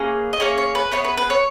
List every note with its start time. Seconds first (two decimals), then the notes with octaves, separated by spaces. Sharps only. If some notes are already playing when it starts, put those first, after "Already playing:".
Already playing: A#3 C#4 G#4 B4
0.33 D#5
0.40 A#3 C#4 G#4 C#5
0.58 C#5
0.75 B4
0.92 B3 D#4 G#4 C#5
1.04 B4
1.17 B4
1.30 C#5